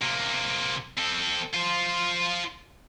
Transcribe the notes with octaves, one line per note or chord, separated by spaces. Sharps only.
C3 A#3
C4 A4
F4 C5